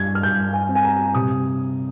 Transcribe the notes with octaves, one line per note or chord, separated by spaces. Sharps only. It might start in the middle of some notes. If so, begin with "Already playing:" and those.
Already playing: G2 G#6
F6
G2 G6
G#5
C4
G#5
A#5
C3 D#6